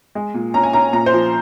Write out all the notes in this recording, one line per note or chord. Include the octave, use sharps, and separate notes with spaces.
G#3
A#2
C#4 A#5
G#5
C#4 A#5
A#2 A#5
C5
F3